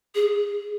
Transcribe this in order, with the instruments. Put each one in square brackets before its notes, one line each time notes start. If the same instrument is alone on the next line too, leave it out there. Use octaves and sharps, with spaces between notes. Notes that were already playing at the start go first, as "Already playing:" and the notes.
[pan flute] G#4